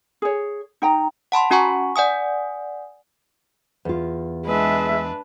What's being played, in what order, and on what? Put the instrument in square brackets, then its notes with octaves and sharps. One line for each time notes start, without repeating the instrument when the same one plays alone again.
[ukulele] G#4 C#5
D#4 G5 A#5
[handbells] F#5 A5 B5 C6
C#4 F#4 F#5 G#5 A#5 C#6
D5 F#5 G#5 D#6
[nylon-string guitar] E2 F4
[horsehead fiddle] G#3 E5 [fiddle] D4 B4